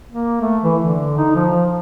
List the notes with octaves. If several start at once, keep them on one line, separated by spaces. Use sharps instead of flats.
A#3
A3
E3
D3
D#4
F3